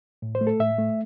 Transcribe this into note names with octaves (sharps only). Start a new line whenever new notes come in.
A2
C5
A3
A4
A2 E5
A3